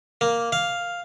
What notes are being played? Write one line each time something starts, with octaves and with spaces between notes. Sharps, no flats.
A#3
F5